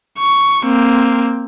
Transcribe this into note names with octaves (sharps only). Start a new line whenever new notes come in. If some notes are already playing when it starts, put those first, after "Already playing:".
C#6
A#3 C4